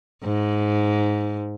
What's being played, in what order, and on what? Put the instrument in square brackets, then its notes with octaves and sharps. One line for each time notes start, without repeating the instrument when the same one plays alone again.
[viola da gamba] G#2